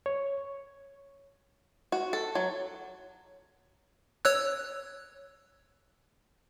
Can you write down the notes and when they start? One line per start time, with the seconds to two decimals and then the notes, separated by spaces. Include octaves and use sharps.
0.06 C#5
1.92 F#4
2.13 A4
2.35 F#3
4.25 C#5 E6 F#6